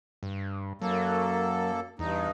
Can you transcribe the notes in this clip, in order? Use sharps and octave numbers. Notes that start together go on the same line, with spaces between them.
G2
F#2 F#3 A#3 A4
E2 G2 D#4